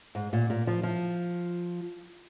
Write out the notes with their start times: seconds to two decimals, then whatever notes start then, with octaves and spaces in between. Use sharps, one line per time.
0.15 G#2
0.33 A#2
0.50 A#2
0.67 F3
0.83 F3